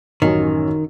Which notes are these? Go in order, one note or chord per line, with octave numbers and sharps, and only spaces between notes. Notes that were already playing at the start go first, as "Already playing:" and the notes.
A1 F#2 D#3 C#4